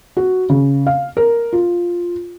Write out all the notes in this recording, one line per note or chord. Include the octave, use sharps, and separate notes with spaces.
F#4
C#3
F5
A#4
F4